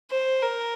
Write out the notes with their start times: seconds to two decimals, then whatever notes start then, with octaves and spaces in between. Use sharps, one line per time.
0.11 C5
0.43 A#4